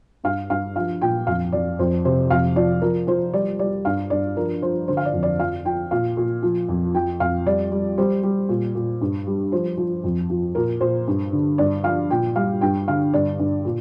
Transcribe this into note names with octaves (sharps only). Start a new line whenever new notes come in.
G2 F5
G2 F5
F3 F5
A#2 G5
F2 F5
F2 D5
F2 C5
C3 C5
F2 F5
F3 D5
F3 A#4
F3 C5
G3 D5
G3 D5
G2 F5
G2 D5
F3 A#4
F3 C5
D3 C5
F5
D5
F2
D5
F3 F5
F3 G5
A#2 F5
A#2
F3
F2
F3 G5
F2 F5
G3 D5
G3
G3 C5
G3
A#2
A#2
G2
G3
F3 C5
F3
F2
F3
A#2 A#4
A#2 C5
G2
D3
G2 D5
F3 F5
A#2 G5
G3 F5
G2 G5
D3 F5
G2 D5
G2
A#2